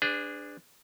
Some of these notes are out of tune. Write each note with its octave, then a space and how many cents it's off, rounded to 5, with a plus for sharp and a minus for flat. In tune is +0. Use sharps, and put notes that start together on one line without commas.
D4 +0 G#4 -20 B4 +45